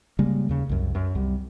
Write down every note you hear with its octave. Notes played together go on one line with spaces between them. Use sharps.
C#3 G3 G#3 A#3
D#2 C#3
C2 F#2
F#2
C2 C3 G3